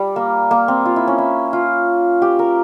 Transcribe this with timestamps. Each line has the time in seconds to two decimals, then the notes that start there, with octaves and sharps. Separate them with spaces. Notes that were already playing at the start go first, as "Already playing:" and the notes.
Already playing: G3
0.16 A#3
0.51 A#3
0.68 C4
0.85 F4
0.96 E4
1.07 C#4
1.18 E4
1.53 F4
2.22 G4
2.39 A#4